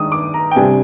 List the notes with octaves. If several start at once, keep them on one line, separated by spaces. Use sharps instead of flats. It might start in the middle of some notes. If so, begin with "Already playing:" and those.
Already playing: D#3 G#3 D4 D#6
D6
A#5
G5
C3 G3 D4 G#5